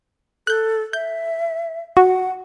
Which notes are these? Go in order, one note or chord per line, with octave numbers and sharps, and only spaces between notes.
A4 F#6 G6
E5 G6
F#4 F#5